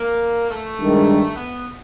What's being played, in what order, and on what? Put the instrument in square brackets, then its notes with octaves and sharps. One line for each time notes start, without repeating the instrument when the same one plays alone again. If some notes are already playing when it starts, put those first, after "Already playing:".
Already playing: [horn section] A#3
A3
[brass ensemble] G2 D#3 G#3
[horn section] B3